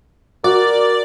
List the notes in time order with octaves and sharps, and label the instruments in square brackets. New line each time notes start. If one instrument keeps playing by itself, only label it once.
[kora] F#4 [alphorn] A#4 [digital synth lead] D5